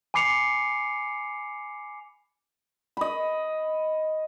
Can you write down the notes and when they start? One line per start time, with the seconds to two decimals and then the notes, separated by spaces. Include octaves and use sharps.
0.14 G#5 B5 D6 C7 C#7 F7
2.97 D#5 B5